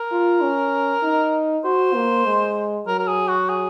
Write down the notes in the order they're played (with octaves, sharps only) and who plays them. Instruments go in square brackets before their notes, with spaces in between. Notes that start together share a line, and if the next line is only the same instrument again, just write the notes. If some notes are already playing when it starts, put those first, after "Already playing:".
Already playing: [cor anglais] A#4
[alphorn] F4
C#4
D#4
[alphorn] F#4 [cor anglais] C5
[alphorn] A#3
G#3
[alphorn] F#3 [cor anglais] A#4
[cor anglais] A#4
G#4
F#4
G#4